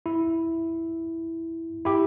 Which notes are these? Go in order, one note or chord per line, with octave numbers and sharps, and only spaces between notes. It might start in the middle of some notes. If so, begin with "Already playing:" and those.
E4
E4 G4